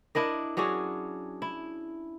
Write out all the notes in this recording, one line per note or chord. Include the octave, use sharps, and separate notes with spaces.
D4 E4 A#4 D#5
F#3 C#4 D4 G#4
E4